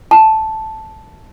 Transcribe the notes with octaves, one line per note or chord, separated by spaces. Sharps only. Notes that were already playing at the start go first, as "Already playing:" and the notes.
A5